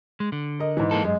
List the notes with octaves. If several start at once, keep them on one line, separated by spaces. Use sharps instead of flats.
G#3
D3
A#4 D#5
G#2 E3
G#3 A#3 A4
F#2 G#3